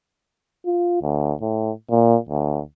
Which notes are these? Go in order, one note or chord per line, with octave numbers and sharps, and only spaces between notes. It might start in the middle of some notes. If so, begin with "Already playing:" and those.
F4
D2
A2
A#2
D2